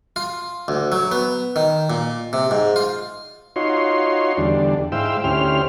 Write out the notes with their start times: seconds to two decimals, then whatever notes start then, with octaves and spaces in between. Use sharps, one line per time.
0.16 F4
0.68 D2
0.92 F#3
1.12 B3
1.56 D#3
1.90 A#2
2.33 C3
2.51 G#2
2.76 F4
3.56 D#4 F4 F#4 C#5 C6
4.37 E2 D3 G3 D4
4.92 G#2 E4 C5 F5 G5 E6
5.24 D2 C#4 E4 G4 C5 F6